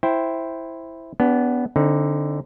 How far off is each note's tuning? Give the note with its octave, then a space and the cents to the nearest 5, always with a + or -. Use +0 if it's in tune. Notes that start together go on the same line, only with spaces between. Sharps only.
E4 +0 C5 +0 G5 +0
B3 +0 D4 -35 G4 +10
D3 +0 C4 +25 D#4 +15